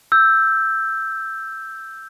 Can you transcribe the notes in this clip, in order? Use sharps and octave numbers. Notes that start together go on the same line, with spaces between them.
E6 G6